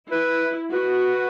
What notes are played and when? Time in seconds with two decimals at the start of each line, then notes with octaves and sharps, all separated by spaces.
0.11 E4 B4
0.72 F#4 B4